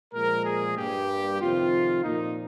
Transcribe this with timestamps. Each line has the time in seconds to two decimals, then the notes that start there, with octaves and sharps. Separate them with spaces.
0.14 A#2 F3 G#3 A#4
0.45 G#4
0.77 G2 G3 A#3 G4
1.40 F2 C3 D#3 F4
2.04 A#2 F3 A#3 D#4